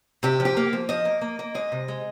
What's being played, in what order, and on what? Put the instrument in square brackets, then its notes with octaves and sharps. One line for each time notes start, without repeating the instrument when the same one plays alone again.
[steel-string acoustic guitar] C3 G4
F3
G4
A#3
F3
F3 D#5
A#3
A#3
A#3
G#3 D#5
C3
G#3